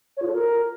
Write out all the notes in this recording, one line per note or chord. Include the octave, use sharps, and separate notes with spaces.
C#5
F4
A4
A#4